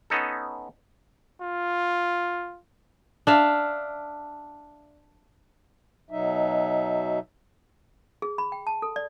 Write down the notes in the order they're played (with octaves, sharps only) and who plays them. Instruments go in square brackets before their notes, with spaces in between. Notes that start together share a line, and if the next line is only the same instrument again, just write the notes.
[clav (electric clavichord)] B3 C#4 D#4 A4
[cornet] F4
[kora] D4 E5 F5
[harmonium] B2 F#3 D#4 E5
[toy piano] G#4
B5
G5
A5
A4
D5